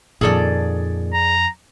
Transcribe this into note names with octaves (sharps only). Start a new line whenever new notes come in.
F2 A#2 D#3 G#4 A4 D5
A#5